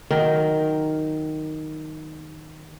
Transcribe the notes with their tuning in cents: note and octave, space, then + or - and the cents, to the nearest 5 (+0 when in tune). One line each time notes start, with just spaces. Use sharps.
D#3 +0 F#3 +0 A#4 +0